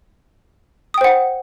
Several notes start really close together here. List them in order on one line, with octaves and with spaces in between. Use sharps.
D#6 G5 C5 F#5